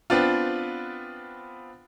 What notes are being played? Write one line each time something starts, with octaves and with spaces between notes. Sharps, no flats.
B3 C4 D4 F4